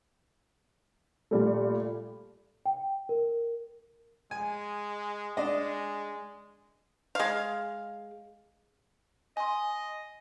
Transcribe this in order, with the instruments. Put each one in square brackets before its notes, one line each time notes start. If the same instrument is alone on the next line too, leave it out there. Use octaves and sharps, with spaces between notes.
[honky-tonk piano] A#2 G3 A3
[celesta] G5
A#4
[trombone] G#3 [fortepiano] G#5
[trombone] G#3 [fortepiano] D4 D5 D#5
[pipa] G#3 F5
[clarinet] D#5 [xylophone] G#5 C6